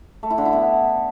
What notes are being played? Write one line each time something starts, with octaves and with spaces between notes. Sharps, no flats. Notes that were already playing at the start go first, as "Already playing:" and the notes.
A3
E4
D3
E4
B3